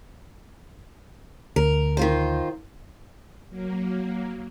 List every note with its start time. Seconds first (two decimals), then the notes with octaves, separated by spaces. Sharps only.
1.56 D2 A#4
1.97 D#3 F4 C5
3.50 F#3 A#3